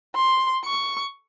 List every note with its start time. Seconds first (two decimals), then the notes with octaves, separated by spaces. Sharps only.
0.15 C6
0.65 C#6